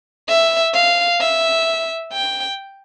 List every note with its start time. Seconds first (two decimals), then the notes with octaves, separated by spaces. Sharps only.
0.28 E5
0.74 F5
1.20 E5
2.12 G5